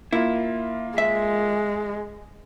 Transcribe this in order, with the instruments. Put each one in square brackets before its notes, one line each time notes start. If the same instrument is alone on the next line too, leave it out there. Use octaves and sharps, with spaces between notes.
[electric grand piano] A#3 F4 [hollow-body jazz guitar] E4
[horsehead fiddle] G#3 [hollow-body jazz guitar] E5